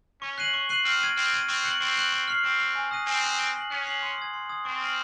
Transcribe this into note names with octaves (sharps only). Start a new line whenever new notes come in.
C#4 C#6
F#6 C7 D#7 F#7
C#6
F#6 C7 D#7 F#7
C4 F6
G#6 D#7
C4 F6
G#6 D#7
C4 C#6
F#6 C#7 F#7
C4 C#6
F#6 C#7 F#7
C#6
F6 C7 F7
C4 C#6
F6 C7 F7
G#5
D#6 F#6 A#6 D#7
C4 G#5
D#6 F#6 A#6 D#7
F#6
C7 F#7
C#4 F#6
C7 F#7
C6
D#6 G#6
C6
D#6 G#6
C4 C#6
F6 A#6 D#7 F#7